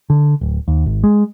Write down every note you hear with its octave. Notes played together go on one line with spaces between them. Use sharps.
D3
D1
D#2
G#1
G#3